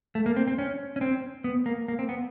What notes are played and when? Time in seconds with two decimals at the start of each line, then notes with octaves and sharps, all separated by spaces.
0.15 A3
0.26 A#3
0.36 C4
0.48 C4
0.58 C#4
0.96 C#4
1.01 C4
1.44 B3
1.66 A#3
1.88 A#3
1.99 C4
2.09 B3